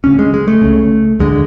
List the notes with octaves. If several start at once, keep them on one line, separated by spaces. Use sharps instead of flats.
D2 C#3 C#4
G#3
G#3
A3
C#2 C#3
D2 D3 G#3